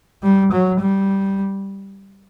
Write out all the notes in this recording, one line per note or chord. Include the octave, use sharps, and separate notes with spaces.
G3
F#3
G3